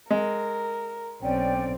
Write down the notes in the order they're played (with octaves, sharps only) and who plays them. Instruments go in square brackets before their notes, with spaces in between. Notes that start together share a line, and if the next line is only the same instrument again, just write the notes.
[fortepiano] G#3 [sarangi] A#4
[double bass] B1 C4 [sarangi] C#4 [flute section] D5 G5